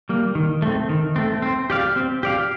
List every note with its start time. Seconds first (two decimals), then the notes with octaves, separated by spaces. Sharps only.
0.09 G3 A#3
0.35 D#3
0.62 A3 C4
0.89 D#3
1.16 A3 C4
1.42 C4
1.70 G4 D5 F5
1.96 C4
2.23 G4 D5 F5